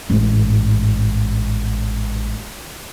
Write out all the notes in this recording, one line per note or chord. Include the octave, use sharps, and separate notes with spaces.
A1 G#2